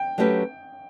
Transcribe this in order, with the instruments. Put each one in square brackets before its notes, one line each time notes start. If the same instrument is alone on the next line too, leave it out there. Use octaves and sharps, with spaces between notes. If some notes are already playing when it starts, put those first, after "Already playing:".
Already playing: [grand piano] G5
[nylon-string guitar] F#3 A3 C#4 G4 B4